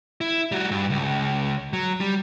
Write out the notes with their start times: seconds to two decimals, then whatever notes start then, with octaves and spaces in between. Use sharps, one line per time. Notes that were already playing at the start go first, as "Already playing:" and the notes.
0.21 E4
0.52 G3 F#4
0.71 G2
0.90 C#2
1.73 F#3
2.01 G3